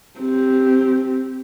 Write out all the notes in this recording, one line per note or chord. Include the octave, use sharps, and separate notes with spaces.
C4 G4